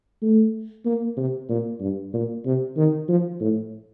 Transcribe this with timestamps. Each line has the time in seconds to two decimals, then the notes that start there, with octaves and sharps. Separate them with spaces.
0.22 A3
0.85 A#3
1.17 C3
1.49 A#2
1.80 G2
2.13 A#2
2.45 C3
2.77 D#3
3.08 F3
3.40 A2